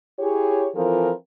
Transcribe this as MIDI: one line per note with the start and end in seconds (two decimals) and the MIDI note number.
0.19 0.67 64
0.19 0.67 67
0.19 0.67 68
0.19 0.67 73
0.75 1.12 52
0.75 1.12 53
0.75 1.12 60
0.75 1.12 65
0.75 1.12 69
0.75 1.12 70